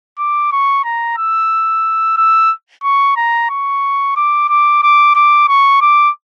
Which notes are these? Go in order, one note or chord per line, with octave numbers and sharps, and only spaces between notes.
D6
C#6
A#5
E6
E6
C#6
A#5
C#6
D6
D6
D6
D6
C#6
D6